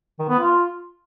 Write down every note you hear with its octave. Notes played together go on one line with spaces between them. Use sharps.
D#3
B3
F4